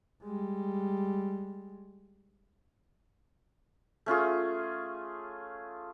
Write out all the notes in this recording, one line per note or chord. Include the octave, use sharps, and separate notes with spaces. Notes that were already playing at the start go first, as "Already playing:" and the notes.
G3 G#3
A3 C#4 F4 G#4